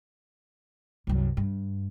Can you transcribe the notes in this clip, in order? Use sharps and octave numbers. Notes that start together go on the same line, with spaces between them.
C2 F#2
G2